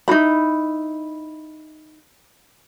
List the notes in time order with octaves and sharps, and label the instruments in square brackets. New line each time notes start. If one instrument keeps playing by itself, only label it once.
[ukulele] D#4 E4 F#4 B5